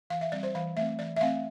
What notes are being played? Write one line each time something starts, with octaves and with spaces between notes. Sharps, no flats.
E3 F5
E5
G3 C4 D5
C5
E3 F5
A3 C4 E5
E3 D5
E5
A3 C4 F5